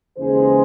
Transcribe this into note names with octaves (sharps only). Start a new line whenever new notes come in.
D#2 C#3 E3 G#3 G#4 C5